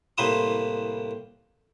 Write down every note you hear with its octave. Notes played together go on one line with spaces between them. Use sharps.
C2 A2 A#3 B4 C5 D#6